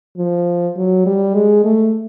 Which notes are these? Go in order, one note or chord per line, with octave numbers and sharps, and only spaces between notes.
F3
F#3
G3
G#3
A3